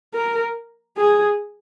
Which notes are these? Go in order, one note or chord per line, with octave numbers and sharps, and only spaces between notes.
A#4
G#4